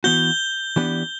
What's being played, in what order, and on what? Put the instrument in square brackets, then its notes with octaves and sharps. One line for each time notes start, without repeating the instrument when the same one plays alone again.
[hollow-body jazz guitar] E3 B3 F#4 [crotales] G6 G7
[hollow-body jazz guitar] E3 B3 D4 G4 B4